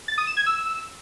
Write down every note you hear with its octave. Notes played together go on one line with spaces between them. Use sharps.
A6
D#6
E7
G#6
E6